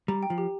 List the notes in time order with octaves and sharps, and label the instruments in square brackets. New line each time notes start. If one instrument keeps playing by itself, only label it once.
[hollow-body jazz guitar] G3 [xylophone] A#5
[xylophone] G5
[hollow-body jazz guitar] F3
[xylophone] G4